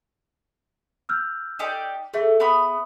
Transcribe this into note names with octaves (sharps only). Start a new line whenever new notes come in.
E6 F6 G6
D#4 G4 D5
A3 G#4 E5
B3 B5 D#6